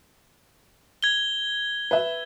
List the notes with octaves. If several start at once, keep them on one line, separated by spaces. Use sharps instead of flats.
G#6 G7
B4 E5